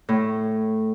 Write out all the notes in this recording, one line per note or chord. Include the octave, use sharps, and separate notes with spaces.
A2